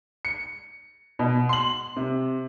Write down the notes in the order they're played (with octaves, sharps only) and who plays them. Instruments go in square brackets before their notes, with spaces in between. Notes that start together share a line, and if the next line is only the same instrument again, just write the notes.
[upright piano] C#7
B2
C6 F#7
C3